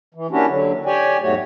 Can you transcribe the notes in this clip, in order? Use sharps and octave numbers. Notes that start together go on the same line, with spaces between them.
E3
A#3 C#4 D4 E4 F#4 G4
D3 F#3
G4 C#5 D5 G5 G#5
E2 G#2 F#3 A3 F#4 C#5